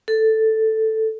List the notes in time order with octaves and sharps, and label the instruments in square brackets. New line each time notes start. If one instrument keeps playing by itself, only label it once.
[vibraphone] A4